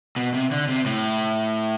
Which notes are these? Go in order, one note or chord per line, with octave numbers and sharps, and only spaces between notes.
B2
C3
D3
C3
A2